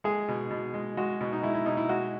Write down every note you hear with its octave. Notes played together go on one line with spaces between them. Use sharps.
G#3 G#4
B2
B2
G#3
G#3 F#4
B2
D#4
G#3 E4
E4
B2 D#4
E4
G#3 F#4